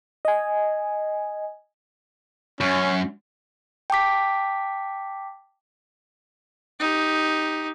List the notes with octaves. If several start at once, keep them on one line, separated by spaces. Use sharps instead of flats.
D#5 G#5
F#2 C#4
G5 A5 D6 B6
D#4 G4